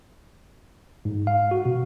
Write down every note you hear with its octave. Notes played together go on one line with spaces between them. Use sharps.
G#2
F5
F#4
B2